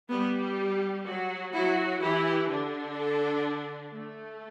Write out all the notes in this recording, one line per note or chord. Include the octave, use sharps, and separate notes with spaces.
G3 B3 G4
F#3 F#4
F#3 E4 F#4
E3 E4 G4
D3 D4
A4
A3